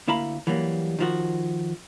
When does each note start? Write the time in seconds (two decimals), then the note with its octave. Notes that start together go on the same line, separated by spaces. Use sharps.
0.08 D2 A#3 E4 F5 A#5 B5
0.47 E3 F#3 G3 A#3
0.99 D#3 F3 F#4